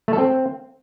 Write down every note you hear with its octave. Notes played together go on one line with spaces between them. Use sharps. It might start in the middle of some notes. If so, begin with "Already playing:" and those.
A3
A4
C4